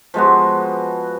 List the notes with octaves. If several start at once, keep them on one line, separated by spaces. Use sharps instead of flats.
F3 G#3 B3 F#4